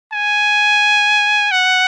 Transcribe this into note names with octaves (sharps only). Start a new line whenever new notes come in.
G#5
F#5